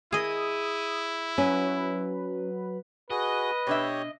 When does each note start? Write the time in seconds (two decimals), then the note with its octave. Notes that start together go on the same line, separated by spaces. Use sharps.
0.12 E4 G#4 D#5 D#6
1.38 F#3 C#4 B4
3.11 F#4 G#4 B4 D#5
3.67 B2 D4 G4 C#5 E5